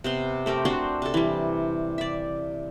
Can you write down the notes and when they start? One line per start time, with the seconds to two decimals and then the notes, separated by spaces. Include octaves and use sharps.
0.04 C3 B3 C6
0.46 A3 C4 G4 A#4
0.65 C4 D4 F#4 C5
1.02 C3 A4
1.14 E3 G3
1.98 D5 E5